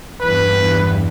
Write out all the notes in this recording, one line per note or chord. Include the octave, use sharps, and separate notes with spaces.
E2 G2 B4